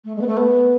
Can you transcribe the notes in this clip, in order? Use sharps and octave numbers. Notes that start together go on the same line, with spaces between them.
A3
G#3
B3
A3
B3